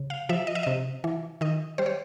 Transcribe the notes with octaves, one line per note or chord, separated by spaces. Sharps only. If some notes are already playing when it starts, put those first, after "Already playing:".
Already playing: C#3
F5
F3 E5
D#5
E5
C3 D#5
E3
D#3 D#5
G3 C5
C#5